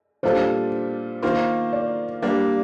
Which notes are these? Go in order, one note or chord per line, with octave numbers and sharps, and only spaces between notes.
A#2 G3 D4 F4 A4 C5
D#3 A#3 F4 C5
D5
G3 A#3 D4